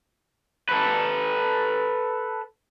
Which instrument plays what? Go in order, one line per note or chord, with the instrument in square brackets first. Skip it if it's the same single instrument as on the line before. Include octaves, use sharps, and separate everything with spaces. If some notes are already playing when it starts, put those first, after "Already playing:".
[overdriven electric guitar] A4 B4